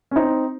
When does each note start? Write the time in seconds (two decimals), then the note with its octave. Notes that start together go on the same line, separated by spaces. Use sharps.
0.11 C#4
0.16 C4 D#4